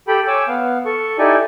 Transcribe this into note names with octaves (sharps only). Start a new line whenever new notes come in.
G4 A4 G5 B5
C#5 G5 G#5 D6 E6
B3 F5
A4 C#6
D#4 E4 G4 A4 D5 G#5